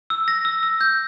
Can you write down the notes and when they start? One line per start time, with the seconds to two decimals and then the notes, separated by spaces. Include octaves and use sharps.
0.10 E6
0.28 A#6
0.45 E6
0.63 E6
0.81 G6